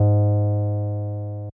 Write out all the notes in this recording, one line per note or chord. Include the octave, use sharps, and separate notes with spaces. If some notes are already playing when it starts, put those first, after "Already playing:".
Already playing: G#2